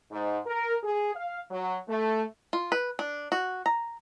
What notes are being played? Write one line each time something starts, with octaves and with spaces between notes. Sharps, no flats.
G#2
A#4
G#4
F5
F#3
A3
F4
B4
D4
F#4
A#5